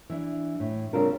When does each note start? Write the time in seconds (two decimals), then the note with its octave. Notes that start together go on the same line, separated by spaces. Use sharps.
0.10 E3 D4
0.60 A2
0.93 C#3 G3 C4 D4 F4 A#4